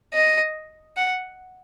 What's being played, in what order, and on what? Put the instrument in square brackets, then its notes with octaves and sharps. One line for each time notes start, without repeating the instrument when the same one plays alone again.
[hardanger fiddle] D#5
F#5